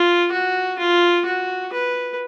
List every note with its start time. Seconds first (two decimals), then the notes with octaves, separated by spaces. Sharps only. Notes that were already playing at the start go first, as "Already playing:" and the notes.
Already playing: F4
0.31 F#4
0.79 F4
1.25 F#4
1.73 B4